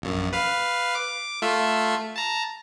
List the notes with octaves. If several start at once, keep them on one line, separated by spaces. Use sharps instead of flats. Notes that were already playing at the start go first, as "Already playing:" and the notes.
A#1 F#2
B4 F5
D6
A3 F4 E5
A5 A#5